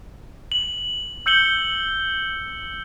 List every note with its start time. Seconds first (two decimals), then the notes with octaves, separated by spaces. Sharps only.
0.52 F#7
1.26 E6 G6 C#7 F#7 G7